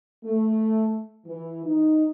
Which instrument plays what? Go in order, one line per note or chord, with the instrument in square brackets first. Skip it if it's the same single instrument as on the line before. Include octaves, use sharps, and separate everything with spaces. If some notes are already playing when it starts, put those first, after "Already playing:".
[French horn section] A3
E3
D#4